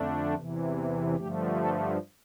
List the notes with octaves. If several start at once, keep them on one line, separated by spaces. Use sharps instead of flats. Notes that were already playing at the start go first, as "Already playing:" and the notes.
Already playing: F2 D3 A3 D4
E2 C3 E3
G2 D3 F3 A3 G4
A4